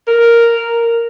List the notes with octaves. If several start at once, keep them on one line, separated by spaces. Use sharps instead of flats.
A#4